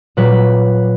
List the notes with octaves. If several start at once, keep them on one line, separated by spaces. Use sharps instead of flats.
A#2 F#3 B4